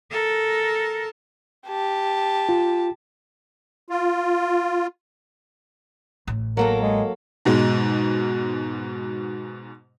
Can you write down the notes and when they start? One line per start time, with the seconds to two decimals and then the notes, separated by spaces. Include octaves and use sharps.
0.11 A4 A#4
1.68 G4 A5
2.49 F4
3.90 F4
6.27 A1
6.57 F#3 A#3 A4 A#4
6.82 G#3
7.45 G#2 B2 G#3